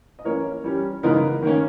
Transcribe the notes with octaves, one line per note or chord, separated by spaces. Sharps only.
D#5
E3 A#3 C#4 A#4 C#5
E3 G3 C#4
C#3 E3 G#3 B3 D#4 A#4
D#3 A#3 C#4